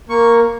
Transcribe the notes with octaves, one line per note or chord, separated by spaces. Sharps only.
A#3 C#6